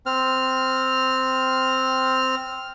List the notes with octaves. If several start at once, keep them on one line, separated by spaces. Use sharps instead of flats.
C4 F6